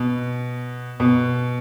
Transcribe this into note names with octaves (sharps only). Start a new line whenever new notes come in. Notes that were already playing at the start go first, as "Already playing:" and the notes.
Already playing: B2
B2